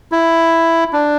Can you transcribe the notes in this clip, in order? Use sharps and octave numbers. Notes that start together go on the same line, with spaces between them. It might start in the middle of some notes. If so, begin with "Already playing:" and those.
E4
D4